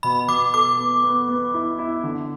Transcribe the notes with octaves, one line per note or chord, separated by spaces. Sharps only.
B2 B5
B2 D6
A4 D6
B3
B3
B3
E4
E4
D3